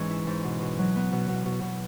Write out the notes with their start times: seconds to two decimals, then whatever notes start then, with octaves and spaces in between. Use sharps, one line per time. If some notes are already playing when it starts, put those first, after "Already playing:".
Already playing: G#2 E3 C#4
0.10 E4
0.27 G#2
0.44 B2
0.61 B2
0.78 F#3
0.96 B3
1.12 B2
1.29 B2
1.45 B2
1.62 B2